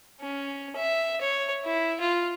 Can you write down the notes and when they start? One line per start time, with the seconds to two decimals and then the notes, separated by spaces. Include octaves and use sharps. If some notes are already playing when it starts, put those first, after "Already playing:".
0.21 C#4
0.76 E5
1.22 C#5
1.65 E4
2.01 F4